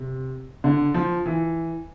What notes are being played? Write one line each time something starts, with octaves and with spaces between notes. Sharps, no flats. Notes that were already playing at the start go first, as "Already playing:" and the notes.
Already playing: C3
D3
F3
E3